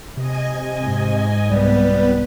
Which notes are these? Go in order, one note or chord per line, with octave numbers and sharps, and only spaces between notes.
C3 D#5 G#5
G#2
C2 G3 B3 B4